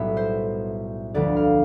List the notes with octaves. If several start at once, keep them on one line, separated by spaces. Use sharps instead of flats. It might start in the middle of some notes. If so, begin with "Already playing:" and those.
Already playing: B1 A2 G3 B3 E5
C5
D2 D3 F3 B3 D5
F5